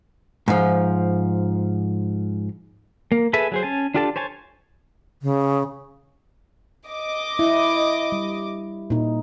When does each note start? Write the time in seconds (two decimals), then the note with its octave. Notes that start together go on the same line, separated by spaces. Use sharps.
0.48 G#2 F3
3.12 A#3
3.33 G#4 A4 B4 E5 G#5
3.52 F#3 G#4 C5
3.63 C#4 G#5 A5
3.94 D4 F4 G4 A4 A5
4.16 C5 C#5 G#5 A5
5.22 C#3
6.89 D#5 D6
7.39 E4
8.12 G3
8.90 A#2 D#4